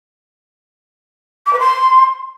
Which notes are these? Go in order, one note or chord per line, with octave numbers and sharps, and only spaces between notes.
D6
B4
C6